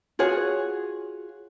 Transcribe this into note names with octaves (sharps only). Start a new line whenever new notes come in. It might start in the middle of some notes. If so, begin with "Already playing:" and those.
F4 F#4 G#4 C#5